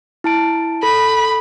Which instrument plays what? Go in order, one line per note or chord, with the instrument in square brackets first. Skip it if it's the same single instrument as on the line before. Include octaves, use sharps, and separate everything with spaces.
[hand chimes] E4 A5 D7
[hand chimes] A4 [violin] B5